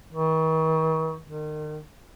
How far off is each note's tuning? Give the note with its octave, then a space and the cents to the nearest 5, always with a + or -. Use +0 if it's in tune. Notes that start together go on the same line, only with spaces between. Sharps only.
D#3 +45
D#3 -35